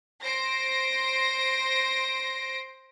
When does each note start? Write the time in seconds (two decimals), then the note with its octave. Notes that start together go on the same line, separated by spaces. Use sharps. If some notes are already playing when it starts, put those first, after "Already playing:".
0.23 C5 A#6 D7